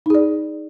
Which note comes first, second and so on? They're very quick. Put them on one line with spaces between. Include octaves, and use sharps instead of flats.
D#4 G#4 D5